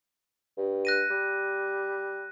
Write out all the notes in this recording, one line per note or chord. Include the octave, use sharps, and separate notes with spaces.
G2
F#6 A#6 D#7
G3